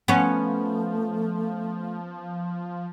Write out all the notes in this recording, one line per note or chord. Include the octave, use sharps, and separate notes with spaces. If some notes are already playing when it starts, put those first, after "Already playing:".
F3 A3 B3 C#4